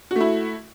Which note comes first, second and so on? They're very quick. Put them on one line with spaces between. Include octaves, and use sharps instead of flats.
F#4 A3 E4